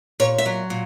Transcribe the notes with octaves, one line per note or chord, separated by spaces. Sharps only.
A#2 C#5
E5
F#3
A#2